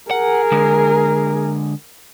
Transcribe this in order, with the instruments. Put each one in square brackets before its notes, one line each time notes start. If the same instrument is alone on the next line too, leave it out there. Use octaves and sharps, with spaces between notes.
[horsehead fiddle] G#4 A#4 [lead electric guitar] F#5
[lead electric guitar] D3 G#3